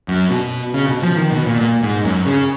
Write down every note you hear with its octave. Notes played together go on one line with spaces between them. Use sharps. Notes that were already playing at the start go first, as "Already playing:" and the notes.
F#2
B2
C#3
B2
F3
D#3
B2
A#2
A#2
G#2
F#2
C#3